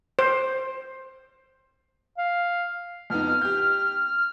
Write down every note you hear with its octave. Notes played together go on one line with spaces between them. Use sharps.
C5
F5
F2 B3 D#4 F6
G4 G6